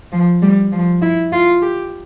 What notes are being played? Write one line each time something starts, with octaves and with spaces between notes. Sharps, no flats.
F3
G3
F3
E4
F4
G4